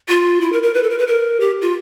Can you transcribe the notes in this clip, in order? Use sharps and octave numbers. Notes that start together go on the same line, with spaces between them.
F4
E4
A#4
A#4
B4
A4
A#4
B4
A#4
G4
F4